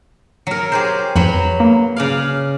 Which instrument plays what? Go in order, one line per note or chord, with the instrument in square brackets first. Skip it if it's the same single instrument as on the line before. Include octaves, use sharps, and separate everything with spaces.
[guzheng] F#3 A#4
G4 G#4 C5
[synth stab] F2 [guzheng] F#3 B4 B5
[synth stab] A#3
[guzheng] C#3 D5 F5